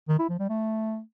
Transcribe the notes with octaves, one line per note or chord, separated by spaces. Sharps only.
D#3
E4
F3
G3
A3